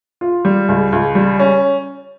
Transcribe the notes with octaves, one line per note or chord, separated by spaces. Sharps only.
F4
G3
C#2
C#2
G3
C#4